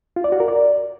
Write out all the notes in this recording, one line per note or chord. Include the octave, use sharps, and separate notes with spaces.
F4
D5
F#4
A#4
D5